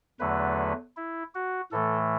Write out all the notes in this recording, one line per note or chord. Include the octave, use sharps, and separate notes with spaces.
E2 D3 F#3 A3 B4
E4
F#4
A2 E3 A3 A4